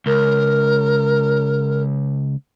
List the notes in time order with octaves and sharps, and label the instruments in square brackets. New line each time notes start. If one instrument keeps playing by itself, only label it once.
[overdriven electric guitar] C#2 [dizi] A#4